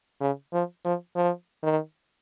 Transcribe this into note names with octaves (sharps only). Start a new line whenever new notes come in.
C#3
F3
F3
F3
D#3